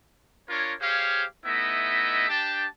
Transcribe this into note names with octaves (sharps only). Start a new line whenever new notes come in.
D4 F4 A#4 C#5
G4 G#4 C5 C#5 F5
A3 B3 D#4 E4 D#5 E5
D4 G4 G5 A5